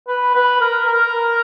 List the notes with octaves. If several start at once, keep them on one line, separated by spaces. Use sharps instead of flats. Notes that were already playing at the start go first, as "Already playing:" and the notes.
B4
B4
A#4
A#4